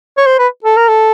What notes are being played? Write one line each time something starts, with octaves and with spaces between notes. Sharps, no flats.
C#5
C5
B4
A4
A#4
A4